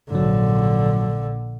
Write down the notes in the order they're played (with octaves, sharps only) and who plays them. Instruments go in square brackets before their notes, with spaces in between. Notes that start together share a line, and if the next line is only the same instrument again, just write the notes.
[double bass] A#1 D3 [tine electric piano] G#2 F#3